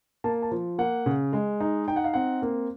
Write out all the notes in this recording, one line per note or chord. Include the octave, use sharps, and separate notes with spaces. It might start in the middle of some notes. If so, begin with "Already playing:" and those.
A#3 A5
A5
F3
A#3 F#5
C#3
G#3
D#4
D#4 G5
F#5
F5
C4 F#5
A#3